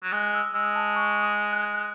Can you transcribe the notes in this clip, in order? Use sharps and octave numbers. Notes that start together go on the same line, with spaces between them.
F#3
G#3 F#6
E6
G#3 E6
A5
C#6
D#6
F#6
G#6
F#6